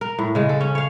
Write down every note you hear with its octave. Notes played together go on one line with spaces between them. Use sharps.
A#4
A2
C#3 G#3
A4
C#4
C#5 F5